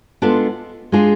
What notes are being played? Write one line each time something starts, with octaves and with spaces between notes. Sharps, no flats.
G#3 B3 D4 F4 A4
G#3 D4 F4 G#4